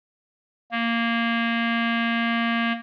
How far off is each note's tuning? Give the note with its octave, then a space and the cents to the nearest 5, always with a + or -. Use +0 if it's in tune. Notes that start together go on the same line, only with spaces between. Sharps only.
A#3 -10